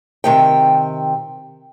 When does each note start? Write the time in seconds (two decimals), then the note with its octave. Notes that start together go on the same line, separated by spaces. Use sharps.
0.24 C3 D#3 G5